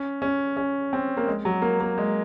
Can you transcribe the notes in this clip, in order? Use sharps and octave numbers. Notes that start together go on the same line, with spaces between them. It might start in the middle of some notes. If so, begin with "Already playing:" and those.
Already playing: C#4
C#4
C#4
C4
A#3
G#3
F#3
A#3
A#3
G#3